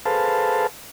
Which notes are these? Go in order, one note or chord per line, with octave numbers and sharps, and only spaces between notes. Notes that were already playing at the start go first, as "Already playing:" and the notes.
G#4 A4 B4 C5 F5 A5